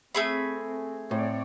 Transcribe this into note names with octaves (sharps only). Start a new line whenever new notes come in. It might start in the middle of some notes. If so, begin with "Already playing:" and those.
A3 C4 G#4 B5
A2 C4 C#5 D5